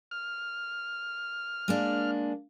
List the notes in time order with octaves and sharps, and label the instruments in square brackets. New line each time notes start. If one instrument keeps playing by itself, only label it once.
[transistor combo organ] F6
[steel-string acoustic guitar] G#3 A#3 D4